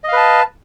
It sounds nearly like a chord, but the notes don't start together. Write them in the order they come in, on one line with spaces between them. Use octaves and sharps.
D#5 F5 B4 A5